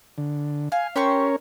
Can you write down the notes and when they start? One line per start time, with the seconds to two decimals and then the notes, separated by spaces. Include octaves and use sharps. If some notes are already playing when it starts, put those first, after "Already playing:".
0.18 D3
0.72 F5 G#5
0.96 C#4 G4 A#4 C5 C#5 C#6